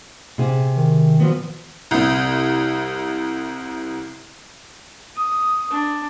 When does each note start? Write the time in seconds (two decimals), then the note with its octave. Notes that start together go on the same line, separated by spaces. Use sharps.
0.38 C3 G#4
0.76 D#3
1.20 F3 F#3 B3
1.91 C2 C3
5.15 D#6
5.71 D4